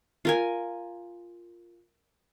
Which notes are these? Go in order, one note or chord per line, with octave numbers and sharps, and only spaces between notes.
F4 A#4 G#5